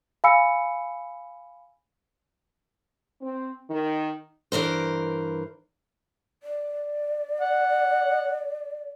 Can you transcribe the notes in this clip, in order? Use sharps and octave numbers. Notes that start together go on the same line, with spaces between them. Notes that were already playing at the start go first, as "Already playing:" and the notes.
F5 G#5 B5 E6 C#7
C4
D#3
G2 E3 A#4 C5
D5
F#5